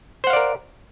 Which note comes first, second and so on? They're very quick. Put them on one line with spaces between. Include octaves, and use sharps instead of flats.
C5 F#5 F5 D5 A#4